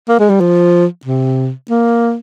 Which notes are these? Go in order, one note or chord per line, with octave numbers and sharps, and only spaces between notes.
A#3
G#3
G3
F3
C3
A#3